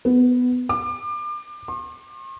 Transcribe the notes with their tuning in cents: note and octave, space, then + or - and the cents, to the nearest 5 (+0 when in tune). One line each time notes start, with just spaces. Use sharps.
B3 +10
D6 +30
C6 +45